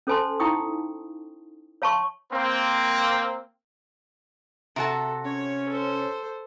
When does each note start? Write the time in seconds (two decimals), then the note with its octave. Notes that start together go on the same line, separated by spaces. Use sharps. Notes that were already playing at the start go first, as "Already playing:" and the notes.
0.07 C#4 A4 C5 G#5 A5 C6
0.40 D#4 E4 F5 G5 C#6 D#6
1.82 C#5 F5 A5 C6 C#6
2.32 A#3 C4
4.76 C3 F#4 A4 A5
5.25 C#4 C#5
5.69 A4 C5